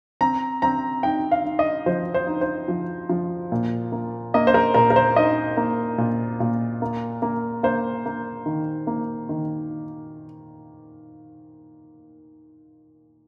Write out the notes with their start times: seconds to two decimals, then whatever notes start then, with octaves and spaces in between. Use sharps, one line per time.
0.21 C4 A#5
0.62 C4 A#5
1.03 D#4 G5
1.32 F5
1.45 D#4
1.59 D#5
1.86 F3 C5
2.14 C5
2.27 D#4
2.41 C5
2.68 F3
3.09 F3
3.52 A#2
3.92 A#3
4.34 A#3 D#5
4.47 C5
4.54 A#4
4.74 A#2 A#4
4.90 A#4
4.96 C5
5.16 D#4 D#5
5.57 A#3
5.98 A#2
6.40 A#2
6.82 A#3
7.22 A#3
7.63 A#3 C5
8.06 A#3
8.46 D#3
8.87 A#3
9.29 D#3